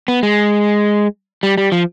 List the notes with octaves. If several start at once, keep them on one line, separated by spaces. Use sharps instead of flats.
B3
G#3
G3
G3
F3